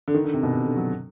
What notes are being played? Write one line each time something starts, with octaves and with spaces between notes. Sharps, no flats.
D3
D#3
D3
C3
B2
C3
D3
F#3